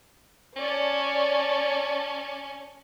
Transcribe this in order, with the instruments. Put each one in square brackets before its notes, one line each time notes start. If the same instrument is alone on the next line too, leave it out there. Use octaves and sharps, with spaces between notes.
[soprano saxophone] C#4 [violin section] C#5 D5 A5